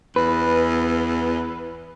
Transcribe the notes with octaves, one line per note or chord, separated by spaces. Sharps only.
E2 B4